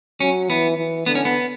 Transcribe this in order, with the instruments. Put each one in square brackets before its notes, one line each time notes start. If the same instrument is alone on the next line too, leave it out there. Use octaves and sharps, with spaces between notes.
[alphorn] F#3 [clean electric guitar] C#4
[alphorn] E3 [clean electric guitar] B3
[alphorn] E3
[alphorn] D3 [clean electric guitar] B3
[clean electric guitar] C#4
B3